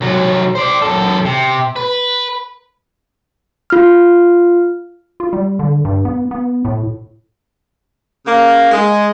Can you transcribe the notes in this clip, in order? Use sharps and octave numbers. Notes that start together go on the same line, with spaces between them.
C2 F#3
C5 D5
F#2 A4
C3
B4
F4 F6
F4
G3
D3
G2
B3
B3
A2
C#3 A#3
G#3